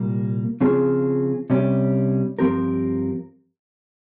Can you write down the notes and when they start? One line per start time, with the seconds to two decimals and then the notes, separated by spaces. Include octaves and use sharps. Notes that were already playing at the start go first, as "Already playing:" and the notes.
Already playing: C2 A#2 G3 A#3
0.61 C#3 F3 C4 F4 G#4
1.50 C3 G3 C#4 G4
2.39 G2 F3 C4 G4 A#4